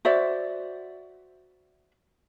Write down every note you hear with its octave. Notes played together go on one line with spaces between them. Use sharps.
F#4 C5 D5 E5